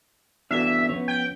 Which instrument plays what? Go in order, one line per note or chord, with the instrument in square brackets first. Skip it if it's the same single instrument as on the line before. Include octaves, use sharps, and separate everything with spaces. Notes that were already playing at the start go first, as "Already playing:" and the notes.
[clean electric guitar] G2 B2 E3 [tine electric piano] D4 F#4 A4 [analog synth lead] E5
[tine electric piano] F3 C#4 [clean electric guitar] B3 C#5
[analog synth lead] G5